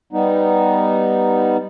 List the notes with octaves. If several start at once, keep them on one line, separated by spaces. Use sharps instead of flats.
G3 B3 D#4